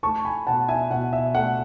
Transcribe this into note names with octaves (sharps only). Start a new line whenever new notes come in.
A3 A5 C#6
G#5 B5
B2 F#5 A5
E5 G#5
B2 F#5
E5
A3 F#5